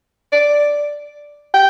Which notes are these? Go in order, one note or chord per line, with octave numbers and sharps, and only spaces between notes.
D5
G5